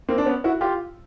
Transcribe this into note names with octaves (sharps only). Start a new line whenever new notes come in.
A#3 C4
D4
B3 C#4
E4 F#4
F4 G4